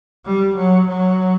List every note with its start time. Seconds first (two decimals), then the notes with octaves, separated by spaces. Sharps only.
0.25 G3
0.56 F#3
0.88 F#3